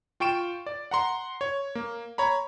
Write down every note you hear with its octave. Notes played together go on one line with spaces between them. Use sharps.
F4 G5 C#6 D7 E7
D5
F#5 A#5 C6
C#5
A#3
C#5 A#5 B5